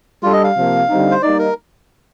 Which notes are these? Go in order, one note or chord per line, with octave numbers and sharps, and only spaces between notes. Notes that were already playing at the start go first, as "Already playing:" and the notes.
G3 D4 F4 A4
D#5
F5
C3 F3 A#3
D3 G3 C4 D#4
C5
G3 A#3 D#4 D5
A#4